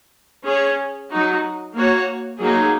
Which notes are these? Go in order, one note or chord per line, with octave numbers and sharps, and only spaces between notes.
C#4 G#4 C#5
F#3 D#4 F#4
A#3 F#4 C#5
F#3 A#3 D#4 G#4